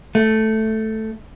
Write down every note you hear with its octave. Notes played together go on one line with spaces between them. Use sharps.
A3